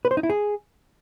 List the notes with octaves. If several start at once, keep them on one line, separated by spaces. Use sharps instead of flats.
B4
C5
D#4
E4
G#4